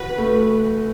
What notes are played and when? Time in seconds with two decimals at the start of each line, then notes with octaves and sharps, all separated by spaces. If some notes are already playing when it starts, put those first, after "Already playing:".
Already playing: C#3 E3 F#4 B4
0.18 A3